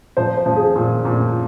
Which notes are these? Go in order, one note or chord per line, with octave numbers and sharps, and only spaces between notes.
F3 C5
C5
F3
G#4
A#2
A#2